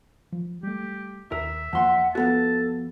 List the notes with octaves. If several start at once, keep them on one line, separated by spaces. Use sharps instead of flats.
F3
G3 A3 G4
D#2 A#4 E5
E2 F3 A#3 F#5 C6
F3 B3 F#4 A4 A5